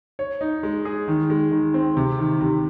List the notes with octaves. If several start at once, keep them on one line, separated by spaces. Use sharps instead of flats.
C#5
D#4
G#3
G#4
D#3
G#3
D#3
C4
C3
D#3
C3